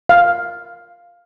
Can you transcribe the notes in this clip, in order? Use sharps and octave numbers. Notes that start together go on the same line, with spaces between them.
F5